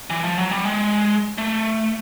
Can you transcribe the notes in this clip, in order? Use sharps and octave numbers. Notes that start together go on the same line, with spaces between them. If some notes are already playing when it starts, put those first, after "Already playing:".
E3
F3
F#3
G3
G#3
A3